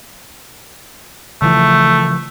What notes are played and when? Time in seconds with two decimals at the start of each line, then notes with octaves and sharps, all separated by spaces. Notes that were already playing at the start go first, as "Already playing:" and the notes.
1.42 C#3 E3 F3 A3